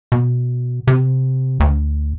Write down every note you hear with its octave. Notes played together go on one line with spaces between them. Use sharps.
B2
C3
D2